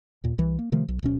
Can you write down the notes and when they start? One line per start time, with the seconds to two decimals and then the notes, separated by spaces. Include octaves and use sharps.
0.24 D#2 A#2
0.38 C2 E3
0.59 A#3
0.72 C3 D#3 F3 A3
0.88 B1
1.03 D1 B2 C#4